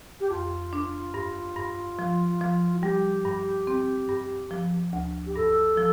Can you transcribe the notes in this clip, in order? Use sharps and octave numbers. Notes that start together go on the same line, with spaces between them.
G4
F2 F4
D4
G2
G2
F3
F3
F4
G3 G4
G2
C4
G2
F3
D2
G4
G2 A4
F3